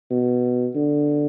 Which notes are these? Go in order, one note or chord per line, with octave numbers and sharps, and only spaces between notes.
B2
D3